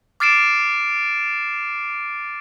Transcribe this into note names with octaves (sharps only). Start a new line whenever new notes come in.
D6 F6 A6 C7 D7 E7